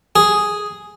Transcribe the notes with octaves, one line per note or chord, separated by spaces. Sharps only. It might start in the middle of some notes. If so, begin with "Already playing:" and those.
G#4